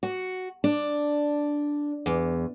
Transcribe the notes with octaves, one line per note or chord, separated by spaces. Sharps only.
F#4
D4
E2